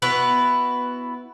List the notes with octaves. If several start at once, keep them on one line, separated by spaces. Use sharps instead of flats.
B3 E4 F#4 B4